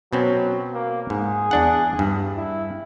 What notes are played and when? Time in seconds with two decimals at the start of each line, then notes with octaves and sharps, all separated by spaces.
0.13 B2 F#3 C4 C#4
0.74 A#3
1.10 G#2 G#4
1.51 E2 D4 F#5
1.99 G2
2.37 E4